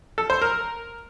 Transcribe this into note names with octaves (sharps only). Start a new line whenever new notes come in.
A4
C5
A#4